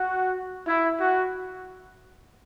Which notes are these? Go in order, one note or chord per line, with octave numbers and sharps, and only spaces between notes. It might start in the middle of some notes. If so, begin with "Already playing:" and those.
Already playing: F#4
E4
F#4